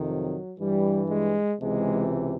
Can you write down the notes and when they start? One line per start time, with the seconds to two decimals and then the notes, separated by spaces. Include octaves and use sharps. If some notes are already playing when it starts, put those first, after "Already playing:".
Already playing: F2 C3 D#3
0.08 F#3
0.59 G2 E3 G3
1.09 G#3
1.60 C#2 C3 E3 G#3